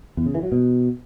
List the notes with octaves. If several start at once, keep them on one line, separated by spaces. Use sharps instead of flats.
E2
C#3
E3
F#3
B2